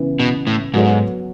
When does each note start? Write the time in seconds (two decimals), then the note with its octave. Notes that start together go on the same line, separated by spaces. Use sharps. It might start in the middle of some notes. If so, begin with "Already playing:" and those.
Already playing: C#3 E3 B3
0.19 B2
0.47 A2
0.73 G#2 F#3 B3 F#4 A4 C#5